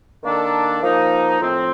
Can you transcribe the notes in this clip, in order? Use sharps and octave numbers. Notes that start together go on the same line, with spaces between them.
D#3 A#3 D4 A4
F3 A#3 D#4
A2 F3 C4